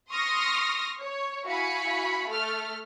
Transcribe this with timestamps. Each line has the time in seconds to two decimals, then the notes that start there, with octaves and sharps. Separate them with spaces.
0.11 C6 C#6 D#6 F6 A#6
1.00 C#5
1.46 E4 F#4 F5 G#5 B5 C#7
2.27 A3 A4 F6